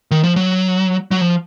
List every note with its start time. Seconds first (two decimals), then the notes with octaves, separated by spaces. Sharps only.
0.11 D#3
0.23 F3
0.36 F#3
1.11 F#3
1.21 F3